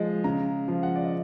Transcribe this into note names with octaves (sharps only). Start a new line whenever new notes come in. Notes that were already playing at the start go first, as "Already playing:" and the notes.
Already playing: F3 G#3
C#3 A#5
F3
F#5
D5
D#5